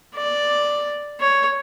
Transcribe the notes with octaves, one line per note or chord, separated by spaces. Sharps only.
D5
C#5